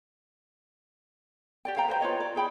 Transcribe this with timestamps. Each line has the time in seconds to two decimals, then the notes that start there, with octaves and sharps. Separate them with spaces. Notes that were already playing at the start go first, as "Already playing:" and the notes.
1.65 G4 D5 G5
1.76 C5 F5 G5 A#5
1.88 B4 C5 D#5 G5
2.01 F4 B4 C#5 D#5
2.20 D5
2.35 E4 G#4 G5 B5